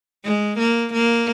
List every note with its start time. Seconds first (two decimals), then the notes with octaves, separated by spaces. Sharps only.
0.24 G#3
0.59 A#3
0.93 A#3